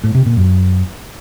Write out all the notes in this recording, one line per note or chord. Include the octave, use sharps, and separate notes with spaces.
A2
C3
A#2
F#2